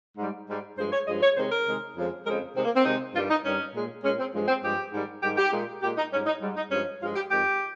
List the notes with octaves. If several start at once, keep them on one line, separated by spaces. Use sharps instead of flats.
G#2 G3
G#2 G3
G2 F3 G#3 C5
C#5
G2 F3 G#3 D#5
C#5
C3 D#3 G#3 C5
A#4
C3 D#3 G#3
F2 C#3 F3 G#3
F2 C#3 F3 G#3 A#4
C3 D#3 G#3 C4
A#3
C4
C3 D#3 G#3 D#4
G2 D#3 G3 F4
D#4
G2 D#3 G3 C#4
A#2 G#3
A#2 G#3 C#4
C4
G2 F3 G#3
C4
G2 F3 G#3 G4
G#2 D#3 G3
G#2 D#3 G3 G4
G4
A#2 G#3
A#2 G#3 G4
D#4
G#2 G3 C#4
D#4
G#2 G3
D#4
G2 F3 G#3 C#4
G2 F3 G#3 F4
G4
F2 D#3 G#3 G4